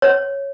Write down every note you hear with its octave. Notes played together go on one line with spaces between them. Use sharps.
C#5